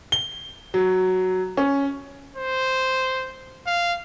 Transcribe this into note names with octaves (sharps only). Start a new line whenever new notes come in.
G7
F#3
C#4
C5
F5